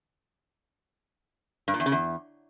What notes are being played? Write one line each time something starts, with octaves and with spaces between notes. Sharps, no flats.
G2
A#2
E2
C#3
E2